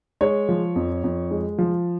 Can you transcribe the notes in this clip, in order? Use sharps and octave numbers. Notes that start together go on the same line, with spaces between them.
G#3 C#5
F3
F2
F2
G#3
F3